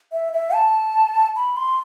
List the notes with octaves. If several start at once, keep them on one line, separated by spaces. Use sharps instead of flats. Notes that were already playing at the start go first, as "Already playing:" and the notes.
E5
E5
A5
B5
C6